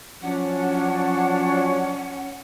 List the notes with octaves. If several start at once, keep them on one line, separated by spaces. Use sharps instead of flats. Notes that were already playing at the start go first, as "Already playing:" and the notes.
F3 F#3 C#4 D4 F#5